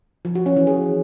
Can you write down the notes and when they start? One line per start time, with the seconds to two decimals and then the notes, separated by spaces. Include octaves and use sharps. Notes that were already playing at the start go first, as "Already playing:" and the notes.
0.25 F3
0.35 F#4
0.46 C#4
0.57 E3
0.67 G#4